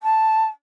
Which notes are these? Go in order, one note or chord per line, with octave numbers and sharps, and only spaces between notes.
A5